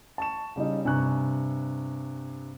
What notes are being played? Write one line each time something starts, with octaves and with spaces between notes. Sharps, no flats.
A5 C#6 E7
C#3 G3 C#4 D#4
G2 C3 G#5 A#5 C#6 F#6